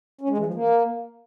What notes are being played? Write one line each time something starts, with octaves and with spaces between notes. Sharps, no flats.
C#4
G#3
E3
F3
A#3